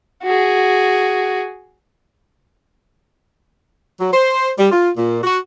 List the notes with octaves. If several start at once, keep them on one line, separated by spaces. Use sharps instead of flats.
F#4 G#4
F#3
C5
G3
F4
A#2
F#4